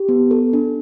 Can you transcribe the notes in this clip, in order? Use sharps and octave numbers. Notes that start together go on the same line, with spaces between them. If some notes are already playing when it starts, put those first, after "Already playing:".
Already playing: G4
B3
A4
D4